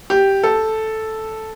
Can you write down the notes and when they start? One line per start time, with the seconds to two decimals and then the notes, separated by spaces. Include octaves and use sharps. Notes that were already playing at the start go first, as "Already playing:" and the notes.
0.10 G4
0.43 A4